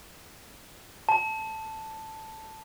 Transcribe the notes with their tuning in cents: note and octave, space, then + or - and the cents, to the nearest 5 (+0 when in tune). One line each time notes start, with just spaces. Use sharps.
A5 +0